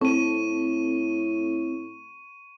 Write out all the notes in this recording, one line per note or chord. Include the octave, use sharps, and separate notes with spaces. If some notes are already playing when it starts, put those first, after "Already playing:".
A2 C4 A4 C#6 D#7